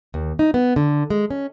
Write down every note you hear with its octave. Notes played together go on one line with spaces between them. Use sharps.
D#2
D#4
B3
D3
G#3
C#4